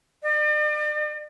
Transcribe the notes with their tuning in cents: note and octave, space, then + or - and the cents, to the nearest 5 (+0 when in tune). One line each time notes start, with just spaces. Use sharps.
D5 +40